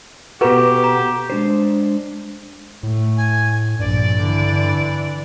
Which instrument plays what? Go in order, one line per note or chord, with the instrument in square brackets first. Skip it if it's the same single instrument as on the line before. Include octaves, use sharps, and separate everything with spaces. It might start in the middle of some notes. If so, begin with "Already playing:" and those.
[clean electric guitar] B2 F#4 [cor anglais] G4 [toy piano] A4 B4 A#5
[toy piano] A#5
[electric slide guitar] G#3 D4 C5
[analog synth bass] A2 [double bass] A3
[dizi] G#5
[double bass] A#1 [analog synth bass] G2 [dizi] D5
[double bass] D3 E3